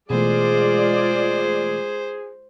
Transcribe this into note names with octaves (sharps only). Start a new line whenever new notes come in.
B2 E3 G#3 A3 F4 G#4 C5 D5